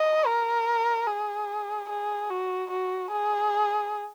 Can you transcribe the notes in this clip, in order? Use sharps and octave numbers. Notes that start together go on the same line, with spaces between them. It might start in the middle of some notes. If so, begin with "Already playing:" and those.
Already playing: D#5
A#4
G#4
G#4
F#4
F#4
G#4